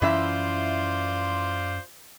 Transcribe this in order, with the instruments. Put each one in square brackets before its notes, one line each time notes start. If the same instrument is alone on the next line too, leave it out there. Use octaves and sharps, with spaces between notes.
[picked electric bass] F#2 C#4 [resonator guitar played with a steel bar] E3 E4 E5 [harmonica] F4 C5 D5